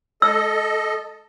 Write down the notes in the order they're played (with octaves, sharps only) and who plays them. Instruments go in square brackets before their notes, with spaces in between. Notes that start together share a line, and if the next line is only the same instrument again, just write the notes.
[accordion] A4 D#5 [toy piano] E6